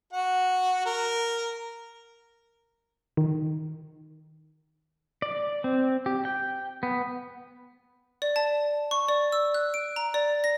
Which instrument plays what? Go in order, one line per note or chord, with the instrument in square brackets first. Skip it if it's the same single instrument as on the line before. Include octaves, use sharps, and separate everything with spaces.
[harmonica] F#4 F#5
A#4
[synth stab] D#3
[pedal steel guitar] D5
C4
G4
G5
B3
[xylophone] D5
A5
C#6
D5
E6
F#6
D7
A#5
D5
A#6